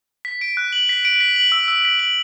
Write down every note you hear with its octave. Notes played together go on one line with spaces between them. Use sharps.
B6
D7
F#6
F#7
B6
D7
B6
F#7
E6
E6
B6
F#7